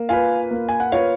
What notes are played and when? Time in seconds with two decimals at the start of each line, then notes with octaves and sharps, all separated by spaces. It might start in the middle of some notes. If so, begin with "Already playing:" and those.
Already playing: A#3
0.09 F4 B4 F5 G#5
0.51 A#3
0.69 G#5
0.80 F#5
0.92 F4 B4 C#5 F5